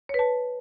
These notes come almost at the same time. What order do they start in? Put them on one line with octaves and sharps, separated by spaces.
C#5 B4 A5